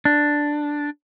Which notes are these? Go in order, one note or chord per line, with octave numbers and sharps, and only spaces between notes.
D4